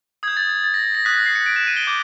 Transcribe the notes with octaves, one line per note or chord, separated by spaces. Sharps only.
D#6 G6 G#6
A6
G#6
A6
A#6
A#6
A#6
D#6 F#6 B6
A#6
C7
C#7
D7
E7
D#7
G7
D6 G6